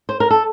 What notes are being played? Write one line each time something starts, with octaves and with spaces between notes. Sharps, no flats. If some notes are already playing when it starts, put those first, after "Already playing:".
C5
A#4
A4